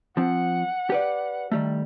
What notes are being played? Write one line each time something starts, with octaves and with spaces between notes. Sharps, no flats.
F3 C4 F#5
G4 B4 D5
D#3 G3 A3